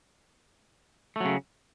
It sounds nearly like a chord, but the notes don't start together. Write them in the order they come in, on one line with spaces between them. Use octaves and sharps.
A3 F#3 C#3